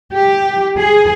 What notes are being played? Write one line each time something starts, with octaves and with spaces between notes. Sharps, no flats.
G4
G#4